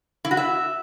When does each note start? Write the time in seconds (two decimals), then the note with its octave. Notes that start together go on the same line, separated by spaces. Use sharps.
0.25 E4
0.31 F#4
0.37 E5